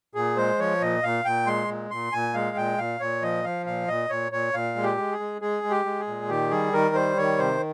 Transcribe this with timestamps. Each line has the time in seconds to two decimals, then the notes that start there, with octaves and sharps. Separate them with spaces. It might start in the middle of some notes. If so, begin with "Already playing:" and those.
0.15 A#2 G#4
0.37 G#3 C5
0.59 F3 C#5
0.81 A#2 D#5
1.03 A#2 F5
1.25 A#2 G5
1.47 G#3 C6
1.68 A#2
1.91 A#2 C6
2.12 A#2 G#5
2.34 G#3 F5
2.56 A#2 G5
2.78 A#2 F5
3.00 A#2 C#5
3.22 F3 D#5
3.44 F3 F5
3.66 A#2 F5
3.88 A#2 D#5
4.10 A#2 C#5
4.31 A#2 C#5
4.53 A#2 F5
4.76 G#3
4.83 G4
4.97 G#3
5.12 G#4
5.20 G#3
5.42 G#3 G#4
5.63 G#3
5.70 G4
5.85 G#3
6.00 G#4
6.07 A#2
6.29 D#3 G4
6.51 G3 G#4
6.73 D#3 A#4
6.95 G3 C5
7.17 D#3 C#5
7.38 C3 C5